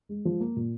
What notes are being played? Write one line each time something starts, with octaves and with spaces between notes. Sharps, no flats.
G#3
F3
A#3
A#2